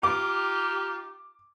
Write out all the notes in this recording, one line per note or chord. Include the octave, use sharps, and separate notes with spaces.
D#4 F4 G4 D6